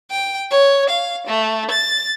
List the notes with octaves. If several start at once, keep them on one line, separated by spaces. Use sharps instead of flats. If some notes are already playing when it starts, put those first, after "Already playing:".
G5
C#5
F5
A3
A6